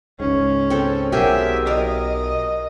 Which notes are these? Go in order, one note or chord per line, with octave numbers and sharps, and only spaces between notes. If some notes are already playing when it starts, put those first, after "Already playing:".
C#2 G#2 C#4
C4 A4
B1 F#3 G4 G#4 A#4 E5
A#4 D#5